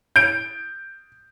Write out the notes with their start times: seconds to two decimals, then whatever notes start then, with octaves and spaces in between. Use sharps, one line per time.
0.16 G6 D7